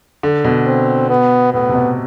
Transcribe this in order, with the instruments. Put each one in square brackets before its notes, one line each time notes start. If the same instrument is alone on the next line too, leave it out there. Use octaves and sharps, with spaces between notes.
[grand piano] D3
B2
[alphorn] C4
B3
[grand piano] A2 [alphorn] B3
[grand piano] C3
B2